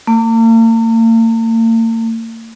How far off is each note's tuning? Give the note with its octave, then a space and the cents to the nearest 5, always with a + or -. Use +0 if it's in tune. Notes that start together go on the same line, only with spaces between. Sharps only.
A#3 -45